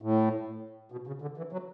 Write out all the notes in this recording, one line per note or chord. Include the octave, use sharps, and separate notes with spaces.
A2
B2
C#3
D3
E3
F#3